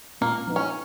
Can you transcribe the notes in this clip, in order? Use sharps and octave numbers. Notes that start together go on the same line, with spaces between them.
A#2 A#3
F3 B3 D#4
C#4